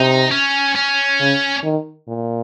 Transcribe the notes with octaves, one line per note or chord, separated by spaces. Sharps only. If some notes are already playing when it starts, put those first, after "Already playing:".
Already playing: C3 D#4
C#4
C#4
C#3
D#3
A#2